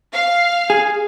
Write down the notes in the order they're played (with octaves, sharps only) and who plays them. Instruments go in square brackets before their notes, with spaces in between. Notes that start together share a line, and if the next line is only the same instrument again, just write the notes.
[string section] F5
[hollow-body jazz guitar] G#4